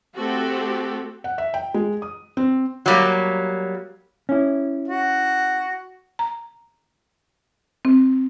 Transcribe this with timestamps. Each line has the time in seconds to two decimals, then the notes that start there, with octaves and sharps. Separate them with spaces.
0.17 A3 C4 F#4 G4 A4
1.24 F#5
1.38 E5
1.54 G5
1.74 G#3
2.02 D#6
2.37 C4
2.86 F#3 G3 A#3
4.29 C#4 E4
4.88 F#4
6.19 A#5
7.85 C4